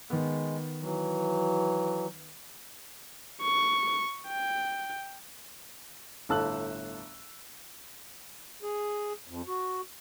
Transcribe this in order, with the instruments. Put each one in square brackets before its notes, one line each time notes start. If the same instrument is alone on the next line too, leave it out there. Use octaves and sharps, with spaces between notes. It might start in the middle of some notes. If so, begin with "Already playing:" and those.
[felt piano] D#3 B3 [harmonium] G#3
[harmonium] E3 F#3
[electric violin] C#6
G5
[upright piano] G1 A2 A5 E6 F#6 F#7
[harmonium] G#4
F2
F#4